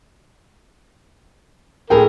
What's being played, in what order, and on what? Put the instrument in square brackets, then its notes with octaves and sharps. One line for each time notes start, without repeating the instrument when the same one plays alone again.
[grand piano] A2 G#4 G5 [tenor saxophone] A#4